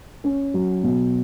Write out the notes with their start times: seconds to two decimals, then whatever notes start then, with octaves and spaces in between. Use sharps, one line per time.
0.24 C#4
0.54 F#3
0.83 B2